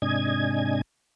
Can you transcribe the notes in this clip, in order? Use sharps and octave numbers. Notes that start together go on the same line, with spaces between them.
G#2 C3 D4 D#5 G#5 G#6